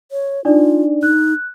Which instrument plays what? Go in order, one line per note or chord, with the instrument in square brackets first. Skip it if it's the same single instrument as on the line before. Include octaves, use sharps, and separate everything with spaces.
[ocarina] C#5
[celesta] D4 D#4 D5 [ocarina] F4
[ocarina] D#4 [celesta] F#6